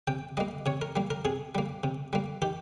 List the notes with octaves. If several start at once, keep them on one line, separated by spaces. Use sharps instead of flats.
C3 G5
G3 A#3 D#5
C3 C#5
A#4
G3 A#3
A#4
C3 G#4
G3 A#3
C3
G3 A#3
D#3 G4